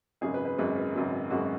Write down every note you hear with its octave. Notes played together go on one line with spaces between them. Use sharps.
G#1 F#2 C#3 G#3 G#4
B4
B4
G#1 F#2 C#3 G#3 B4
B4
G#1 F#2 C#3 G#3
G#1 F#2 C#3 G#3 F#4